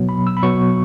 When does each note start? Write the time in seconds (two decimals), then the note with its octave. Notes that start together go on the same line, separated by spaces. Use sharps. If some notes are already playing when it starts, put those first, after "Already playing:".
Already playing: B2 F#3 B3
0.09 B5
0.27 E6
0.37 B5
0.43 B2 F#3 B3 C#6